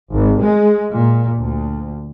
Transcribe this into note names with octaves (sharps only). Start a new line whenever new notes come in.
G#1
G#3
A#2
D2